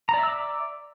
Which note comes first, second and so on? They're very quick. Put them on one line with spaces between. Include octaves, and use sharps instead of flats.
A#5 D5 E5 E6 D6